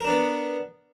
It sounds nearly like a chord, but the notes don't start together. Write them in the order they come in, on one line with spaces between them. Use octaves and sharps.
A#4 D4 B3